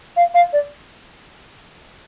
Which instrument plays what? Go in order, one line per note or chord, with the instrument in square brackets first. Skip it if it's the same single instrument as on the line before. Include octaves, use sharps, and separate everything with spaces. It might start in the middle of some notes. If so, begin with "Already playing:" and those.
[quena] F5
F5
D5